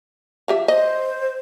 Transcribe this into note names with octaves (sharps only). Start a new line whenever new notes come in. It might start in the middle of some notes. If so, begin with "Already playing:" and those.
F3 G4 E5
C5 D#5